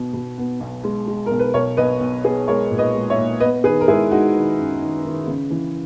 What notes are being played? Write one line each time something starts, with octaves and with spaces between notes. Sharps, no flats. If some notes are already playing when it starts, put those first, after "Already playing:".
Already playing: B2 B3
B2
B3
B1
G#3
G#3
B1 A#4
B4
B1 A#4 C#5
B1 B4 D#5
B1
B3 G#4 B4
G#3 A#4 C#5
A#2
B4 D#5
G#3
C#5 E5
A#2
B3 B4 D#5
D#3 G#4 B4
A#4
G#3 E4 G#4
G#3 D#4 F#4
D#3
F#2
D#3
D#3
C#3
E3